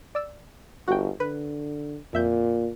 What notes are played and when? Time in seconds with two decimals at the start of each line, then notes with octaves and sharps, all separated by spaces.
0.15 D5 E6
0.88 G1 F#4 G5
1.20 D3 B4
2.13 F2 A#2 E5 G6